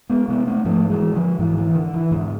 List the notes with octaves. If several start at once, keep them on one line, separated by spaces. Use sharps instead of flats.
G#3 B3
C3 G#3 B3
A3 C4
G#2 F3 A3
E3 G#3
D3 F3
G#2 E3
E3
D3
E3
G#2 D3